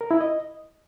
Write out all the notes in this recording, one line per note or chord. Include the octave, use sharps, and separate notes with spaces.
A#4
E4
D#5